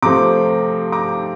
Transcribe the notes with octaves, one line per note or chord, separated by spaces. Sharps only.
C3 F3 A3 C4 A#5 D6
A#5 D6